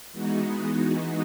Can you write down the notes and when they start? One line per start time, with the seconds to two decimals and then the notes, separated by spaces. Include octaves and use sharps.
0.12 E3 G#3 B3 D#4 F#4